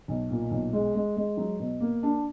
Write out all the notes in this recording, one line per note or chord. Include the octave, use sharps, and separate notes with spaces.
B1
A#2
B1
G#3
G#3
G#3
F#3
B2
A#3
D4